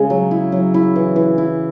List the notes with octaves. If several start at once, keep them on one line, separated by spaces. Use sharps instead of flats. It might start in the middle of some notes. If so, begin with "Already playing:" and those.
Already playing: C#3 G#3 G#4 C#5
F#3
E4
F#3
E4
E3
E3
E4